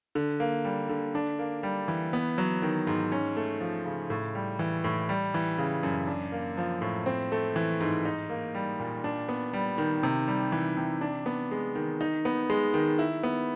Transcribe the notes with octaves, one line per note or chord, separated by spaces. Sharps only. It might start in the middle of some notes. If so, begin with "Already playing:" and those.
D3
A#3
G3
D3
D4
A#3
G3
E3
B3
F#3
D#3
G#2
C#4
A3
F3
C#3
A2
G3
E3
A2
G3
E3
C#3
F#2
D4
A#3
F3
A2
C4
A3
E3
G#2
D#4
A#3
G3
A#2
D4
B3
G3
D#3
C3
G3
E3
C3
D4
B3
G#3
D#3
D#4
B3
G#3
D#3
E4
B3